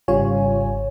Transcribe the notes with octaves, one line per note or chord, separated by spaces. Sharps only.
G#1 C#3 G3 F4 C#5 G#5